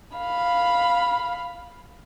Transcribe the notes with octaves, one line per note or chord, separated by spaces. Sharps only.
F5 B5